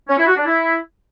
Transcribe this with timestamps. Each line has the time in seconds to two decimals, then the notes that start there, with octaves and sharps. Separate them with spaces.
0.09 C#4
0.18 E4
0.27 F#4
0.37 D4
0.46 E4